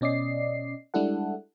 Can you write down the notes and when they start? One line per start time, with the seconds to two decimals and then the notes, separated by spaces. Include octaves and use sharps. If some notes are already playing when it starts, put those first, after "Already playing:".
0.01 B2 C#4 D5 D#5 C7
0.94 G3 G#3 D4 E4 A4 F#5